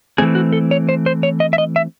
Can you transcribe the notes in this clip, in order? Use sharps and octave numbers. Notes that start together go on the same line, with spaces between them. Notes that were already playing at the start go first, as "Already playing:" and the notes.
E3 A3 C4 G#4
F#4
A4
C#5
C5
C5
C#5
D#5
E5
D#5
E5